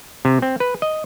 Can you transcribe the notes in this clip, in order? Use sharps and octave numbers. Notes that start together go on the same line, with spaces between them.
C3
C4
B4
D#5